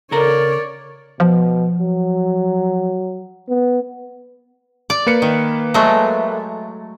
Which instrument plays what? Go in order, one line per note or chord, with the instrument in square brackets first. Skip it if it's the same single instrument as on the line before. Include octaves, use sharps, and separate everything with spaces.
[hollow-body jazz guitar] C#3 A4 A#5 [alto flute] A#4 [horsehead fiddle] C#5 D5
[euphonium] B2 [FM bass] F3
[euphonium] F#3
B3
[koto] D5
[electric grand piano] A#3 B4 C#7
[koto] D#3
F#3 G#3 A3